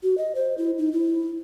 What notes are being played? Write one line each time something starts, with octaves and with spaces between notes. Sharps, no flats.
F#4
D#5
C5
E4
D#4
E4